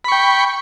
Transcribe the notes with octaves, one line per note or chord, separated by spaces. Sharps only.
G5 B5 C#6